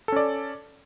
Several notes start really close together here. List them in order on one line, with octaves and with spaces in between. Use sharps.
A4 C#4 D5